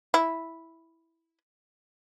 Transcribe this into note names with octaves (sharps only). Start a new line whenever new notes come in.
E4